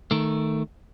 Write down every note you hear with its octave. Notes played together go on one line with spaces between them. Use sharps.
D#3 A3